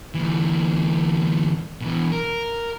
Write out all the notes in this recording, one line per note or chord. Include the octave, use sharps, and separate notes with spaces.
D2 E3
B2 E3
A#4